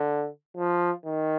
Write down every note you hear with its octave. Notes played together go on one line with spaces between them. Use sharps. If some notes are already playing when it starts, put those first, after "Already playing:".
Already playing: D3
F3
D#3